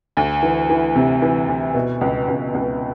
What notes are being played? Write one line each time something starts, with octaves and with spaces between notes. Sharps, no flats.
D2
E3
E3
C3
E3
D2
B2
C#2
C#2
C#2